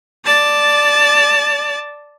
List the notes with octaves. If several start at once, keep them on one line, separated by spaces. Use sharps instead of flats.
D5 A5